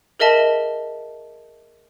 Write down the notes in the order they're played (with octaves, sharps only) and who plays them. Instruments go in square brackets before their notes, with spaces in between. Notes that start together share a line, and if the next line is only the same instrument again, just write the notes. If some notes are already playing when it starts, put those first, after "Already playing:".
[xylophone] G#4 A#4 D#5 E5 A5